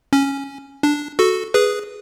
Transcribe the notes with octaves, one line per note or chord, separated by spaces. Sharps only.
C#4
D4
F#4 A4
G#4 B4